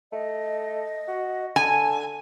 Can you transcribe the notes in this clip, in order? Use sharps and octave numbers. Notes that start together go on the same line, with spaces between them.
A3 D#5
F#4
D3 G#5 A5